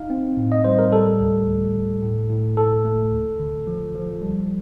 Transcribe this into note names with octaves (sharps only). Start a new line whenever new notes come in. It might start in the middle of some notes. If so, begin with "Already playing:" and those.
Already playing: D#4 F5
C4
A2
D#5
G3 C5
A#4
G3 A4
D2
D2
D2
A2
A2
A2 A4
A3
D2
D3
F3
F3
G3